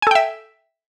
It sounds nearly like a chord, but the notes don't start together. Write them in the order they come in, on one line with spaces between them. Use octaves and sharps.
G#5 A4 G5 E5